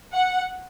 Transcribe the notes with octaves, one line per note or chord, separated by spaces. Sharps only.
F#5